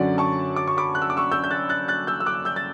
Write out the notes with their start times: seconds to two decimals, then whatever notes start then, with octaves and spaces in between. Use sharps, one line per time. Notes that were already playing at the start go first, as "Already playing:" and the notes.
Already playing: F#2 D3 F#3 C#4 D5 F#5
0.18 A5 C#6
0.56 D6
0.68 C#6
0.77 B5 D6
0.95 F#6
1.02 E6
1.10 D6
1.17 C#6 E6
1.32 E6 G6
1.44 G6
1.51 F#6 A6
1.69 F#6 A6
1.88 F#6 A6
2.07 E6 G6
2.20 E6
2.26 D6 F#6
2.45 E6 G6
2.56 A6